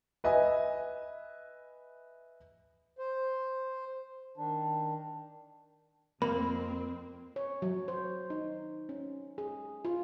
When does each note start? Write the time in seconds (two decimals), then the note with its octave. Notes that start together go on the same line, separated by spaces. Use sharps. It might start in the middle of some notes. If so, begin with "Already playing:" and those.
0.24 B4 D#5 E5 G#5
2.98 C5
4.37 D#3 D4
6.22 F2 A#3 C4 B5
7.36 C#5
7.62 F#3
7.88 C5
8.30 D#4
8.89 C#4
9.38 G#4
9.85 F4